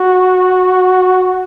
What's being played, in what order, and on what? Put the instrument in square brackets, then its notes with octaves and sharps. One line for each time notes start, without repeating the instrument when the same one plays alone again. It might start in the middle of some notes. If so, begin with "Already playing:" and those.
Already playing: [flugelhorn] F#4